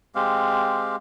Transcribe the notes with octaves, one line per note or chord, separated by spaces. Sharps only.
G#3 C4 G4 F5